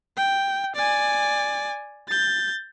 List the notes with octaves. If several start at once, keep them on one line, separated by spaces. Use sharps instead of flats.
G5
D5 G#5
G6 A6